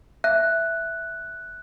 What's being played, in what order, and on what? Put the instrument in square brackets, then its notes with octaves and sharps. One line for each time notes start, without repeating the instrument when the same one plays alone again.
[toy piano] E5 [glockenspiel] F#6